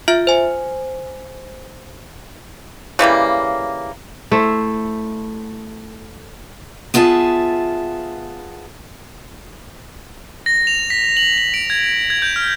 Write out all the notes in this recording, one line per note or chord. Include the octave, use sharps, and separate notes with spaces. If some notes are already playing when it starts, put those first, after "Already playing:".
F4 E5 F6
C5 G#5
C#3 E3 G3 A#3
A3 E4 C5
B3 F4 G#4 E5 A5
A#6
F7
B6
F#7
F#7
D7
G#6
G#6
G6
F6